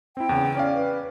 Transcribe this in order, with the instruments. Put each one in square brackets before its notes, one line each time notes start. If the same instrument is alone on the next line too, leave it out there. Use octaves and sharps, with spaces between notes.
[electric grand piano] C4 E4 [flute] G5
[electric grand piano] E2 C#3
C#4 D5 F5
[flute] B4